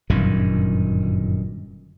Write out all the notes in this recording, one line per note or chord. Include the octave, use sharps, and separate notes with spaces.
G1 F#2 A#2 D#3